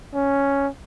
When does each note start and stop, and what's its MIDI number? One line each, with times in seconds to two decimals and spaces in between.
0.14 0.69 61